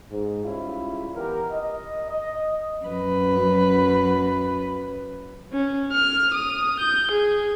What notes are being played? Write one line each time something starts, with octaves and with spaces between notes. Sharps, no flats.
G#2
G#2 G3 C#4 E4 F4
E3 B3 G4 A#4
D#5
D#5
F#2 B4
C#4
F6
D#6
G6
G#4